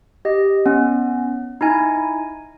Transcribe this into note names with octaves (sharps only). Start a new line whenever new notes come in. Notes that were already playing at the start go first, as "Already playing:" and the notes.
G4 D#5
B3 C#4
D#4 E4 G#5